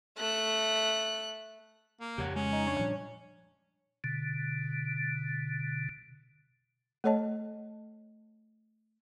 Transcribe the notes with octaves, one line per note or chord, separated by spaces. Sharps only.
A3 F#6
A#3
F2 C#3 G4 C#5 F#5
G#3 C#4
D#4
D4 C#5
A#2 F3 G3
B2 D3
A3 A4 C#5 D#5 A5